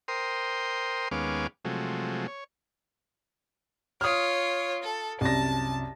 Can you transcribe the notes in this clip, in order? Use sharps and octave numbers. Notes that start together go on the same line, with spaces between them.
A#4 C5 G5 C6 D#6
D#2 G#3 B3 C#4 F5 D6
C3 F3 F#3 G#3 A3
C#5
F4 C#5 D#6 F6
A4
C2 F#2 A5 A#6